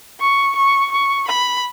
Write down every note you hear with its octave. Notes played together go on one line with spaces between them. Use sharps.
C#6
C#6
C#6
B5